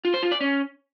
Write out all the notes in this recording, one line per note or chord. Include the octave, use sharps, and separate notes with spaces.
F4
C5
F4
D5
C#4